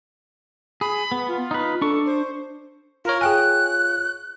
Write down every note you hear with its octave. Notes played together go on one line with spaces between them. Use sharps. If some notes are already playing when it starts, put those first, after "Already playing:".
G#4 B5
B3
F4
D#4 B4
D4 A4 C#6
C5
F4 A#4 C#5
G#4 G5 G#5 F#6